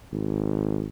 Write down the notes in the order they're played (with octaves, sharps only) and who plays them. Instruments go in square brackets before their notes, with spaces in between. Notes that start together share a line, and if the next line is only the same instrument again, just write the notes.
[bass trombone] G#1